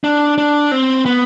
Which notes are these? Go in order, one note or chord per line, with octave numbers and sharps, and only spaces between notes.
D4
D4
C4
B3